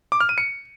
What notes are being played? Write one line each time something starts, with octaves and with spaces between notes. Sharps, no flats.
D6
F6
D#7
C#7